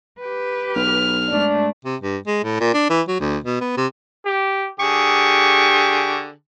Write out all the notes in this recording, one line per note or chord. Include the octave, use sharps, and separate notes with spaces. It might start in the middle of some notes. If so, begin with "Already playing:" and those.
G4 B4
B1 F6
G#2 A3 D4
C3
G2
G#3
A2
A#2
D4
E3
F#3
D2
B2
B3
C3
G4
D3 G4 G#4 C#6